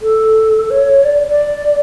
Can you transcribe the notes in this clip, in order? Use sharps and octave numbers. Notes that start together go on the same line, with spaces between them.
A4
C#5
D5
D5